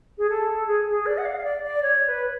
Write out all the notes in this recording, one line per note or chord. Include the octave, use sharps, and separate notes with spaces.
G#4
A4
G#4
G#4
D5
F#5
F5
F5
D5
D5
C#5
B4